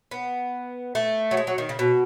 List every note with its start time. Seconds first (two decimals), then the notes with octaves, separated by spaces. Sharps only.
0.11 B3
0.95 A3
1.31 F#3
1.37 G#3
1.47 F#3
1.58 D#3
1.69 C#3
1.79 B2